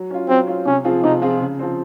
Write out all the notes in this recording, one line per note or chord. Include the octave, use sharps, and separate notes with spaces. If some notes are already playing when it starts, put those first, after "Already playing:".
Already playing: F#3
C#4 F4
F#3 C4
C#4 F4
C3 C#4
F3 C4 F4 G#4
C3 D#4
F3 C4 F4 G#4
C#3
F3 C4